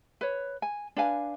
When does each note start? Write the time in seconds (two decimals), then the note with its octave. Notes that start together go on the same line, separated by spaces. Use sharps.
0.21 B4 C#5
0.62 G#5
0.96 D4 B4 F5 G#5